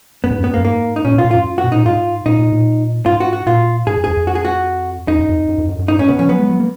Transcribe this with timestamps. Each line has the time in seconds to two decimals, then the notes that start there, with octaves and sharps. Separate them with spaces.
0.24 F#2 B3
0.31 G#2
0.38 F#2
0.44 B3
0.54 A#3
0.57 F#2
0.64 G#2 A#3
0.96 D#4
1.05 A#2 C#4
1.14 B2 F4
1.25 A#2
1.31 F#2 F4
1.58 F#4
1.63 B2
1.72 A#2 D#4
1.85 G#2 F4
2.26 A#2 D#4
2.39 A#2
2.52 A#2
3.06 G#2 F4
3.20 F#4
3.33 F#4
3.47 A#2 F4
3.87 G#2 G#4
3.97 F#2
4.04 F2 G#4
4.17 F2
4.27 F#4
4.35 G#4
4.45 F#4
5.08 F2 D#4
5.19 F#2
5.29 F2
5.49 F#2
5.58 F2
5.69 F#2
5.79 F#2
5.88 G#2 D#4
5.99 G#2 C#4
6.08 C#3 B3
6.19 F3 C#4
6.29 F#3 B3
6.39 G#3
6.50 F#3
6.60 A#3